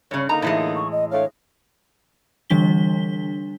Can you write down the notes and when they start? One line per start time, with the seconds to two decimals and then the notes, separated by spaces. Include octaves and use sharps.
0.11 G2 C#3 C#5
0.29 D3 A#3 D#4 A#5
0.42 A2 E3 G#3
0.76 C#6
0.92 D#5
1.11 A3 D4 C#5 F5
2.50 D3 E3 G3 D4 B6 G7